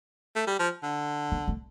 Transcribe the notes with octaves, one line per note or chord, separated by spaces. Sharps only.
A3
G3
F3
D3
A#3
A3